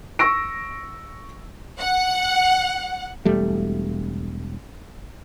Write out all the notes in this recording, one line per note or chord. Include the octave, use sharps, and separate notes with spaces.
C#6 E6 A#6 D7
F#5
E1 G3 A3